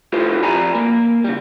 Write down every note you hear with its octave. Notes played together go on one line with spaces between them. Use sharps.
E4 F4 G4 A4 C5
F2 D5 G#5 A#5 B5
A#3
C#3 G3